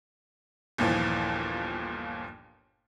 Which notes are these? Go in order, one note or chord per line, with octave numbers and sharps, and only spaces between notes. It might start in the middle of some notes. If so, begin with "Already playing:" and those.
G1 D#2 A#2 E3 F3